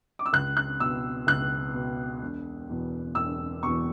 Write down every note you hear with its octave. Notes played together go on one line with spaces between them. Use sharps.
D6
E6
C#2 F#6
F#6
B2 E6
C#2 F#6
B2
E1
E2 B2
E1 E6
E2 B2 C#6